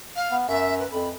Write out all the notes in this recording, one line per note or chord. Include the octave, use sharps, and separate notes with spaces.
F5
B3
F#2 E5
B4
F2 B5